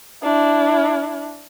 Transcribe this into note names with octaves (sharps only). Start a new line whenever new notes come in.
D4 E4